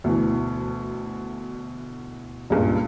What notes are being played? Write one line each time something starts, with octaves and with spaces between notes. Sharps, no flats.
D2 B2 E3
C#2 G2 A#2